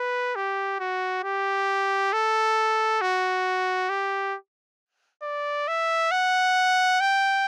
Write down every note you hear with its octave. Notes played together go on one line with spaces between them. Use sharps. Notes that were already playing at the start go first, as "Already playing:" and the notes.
Already playing: B4
G4
F#4
G4
A4
F#4
G4
D5
E5
F#5
G5